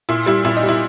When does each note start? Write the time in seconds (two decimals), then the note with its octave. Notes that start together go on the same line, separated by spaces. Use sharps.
0.09 A#2 E4
0.26 G3 E4
0.45 A#2 E4
0.57 D#4
0.63 G3
0.69 E4